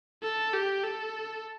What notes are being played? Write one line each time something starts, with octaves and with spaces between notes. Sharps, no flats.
A4
G4
A4